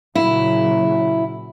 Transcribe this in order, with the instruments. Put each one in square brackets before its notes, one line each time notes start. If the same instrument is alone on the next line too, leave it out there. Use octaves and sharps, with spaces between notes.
[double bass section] A#2 C#3 F#3 [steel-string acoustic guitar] E4